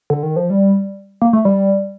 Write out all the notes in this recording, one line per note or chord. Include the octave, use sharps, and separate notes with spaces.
D3
D#3
F3
G3
A#3
A3
G3